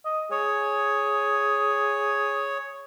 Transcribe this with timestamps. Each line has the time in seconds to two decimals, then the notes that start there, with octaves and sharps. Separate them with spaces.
0.05 D#5
0.31 G#4 C#5